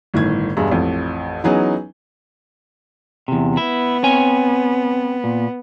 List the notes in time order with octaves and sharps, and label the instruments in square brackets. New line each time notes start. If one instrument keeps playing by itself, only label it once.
[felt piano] G1 A2 D#3 G#6
E1 G2 G#3
A1 F2
E3 F#3 B3 C#4 D#4 G#4
[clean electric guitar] E2 C3
[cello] B3 [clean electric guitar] E4
[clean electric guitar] C4 C#5 G#5
A#2